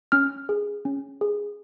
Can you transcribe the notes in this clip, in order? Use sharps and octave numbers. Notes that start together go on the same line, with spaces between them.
C#4 F6
G#4
C#4
G#4